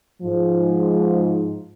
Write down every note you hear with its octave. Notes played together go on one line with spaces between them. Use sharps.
G#2 F3